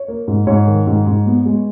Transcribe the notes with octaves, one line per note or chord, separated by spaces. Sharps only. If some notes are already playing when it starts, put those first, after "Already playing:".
Already playing: C#5
A#3
G#2
G#2 C#5
D#3
G#2
G#2
B3
G#3